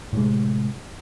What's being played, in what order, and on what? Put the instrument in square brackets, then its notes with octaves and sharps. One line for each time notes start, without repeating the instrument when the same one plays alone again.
[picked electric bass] A2 C3 G#3